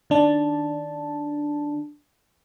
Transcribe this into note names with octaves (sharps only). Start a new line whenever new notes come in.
D#3 D4 A5